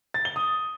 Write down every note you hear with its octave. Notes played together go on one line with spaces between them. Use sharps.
A6
G7
D#6